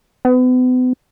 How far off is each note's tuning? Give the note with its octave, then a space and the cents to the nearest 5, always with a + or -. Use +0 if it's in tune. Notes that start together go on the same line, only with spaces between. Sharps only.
B3 +40